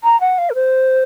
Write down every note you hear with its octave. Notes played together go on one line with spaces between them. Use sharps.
A#5
F#5
F5
A#4
C5